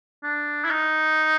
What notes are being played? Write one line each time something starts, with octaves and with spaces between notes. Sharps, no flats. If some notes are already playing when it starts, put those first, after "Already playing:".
D4
E4
D#4